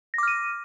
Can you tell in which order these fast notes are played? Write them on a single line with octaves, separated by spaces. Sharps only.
A#6 D6 F6 D#7